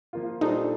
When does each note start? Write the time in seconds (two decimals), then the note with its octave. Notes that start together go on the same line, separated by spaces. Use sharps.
0.13 F3 A#3 F4
0.41 A#2 G3 D4 D#4 A4 C5